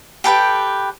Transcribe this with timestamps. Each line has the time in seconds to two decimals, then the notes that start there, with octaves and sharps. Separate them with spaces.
0.24 G4 A4 B4 G5